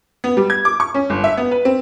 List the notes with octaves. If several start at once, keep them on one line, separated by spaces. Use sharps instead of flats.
B3
G3
G#6
D6
C#6
C#4
G1
E5
B3
B4
C4